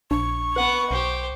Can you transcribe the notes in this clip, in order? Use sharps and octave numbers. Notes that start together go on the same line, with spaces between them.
A#1 D4 C#6
B3 B4 F#5
B1 G4 C5